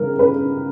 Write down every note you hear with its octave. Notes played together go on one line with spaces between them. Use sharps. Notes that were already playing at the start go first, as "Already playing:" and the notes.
Already playing: C#3 G3 A#4
B4